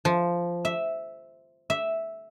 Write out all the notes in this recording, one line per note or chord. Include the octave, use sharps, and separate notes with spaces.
F3
E5
E5